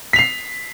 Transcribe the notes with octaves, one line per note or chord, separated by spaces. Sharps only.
B6 C7 F7